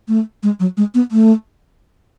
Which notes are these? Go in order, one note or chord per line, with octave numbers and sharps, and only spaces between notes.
A3
G#3
F#3
G#3
B3
A3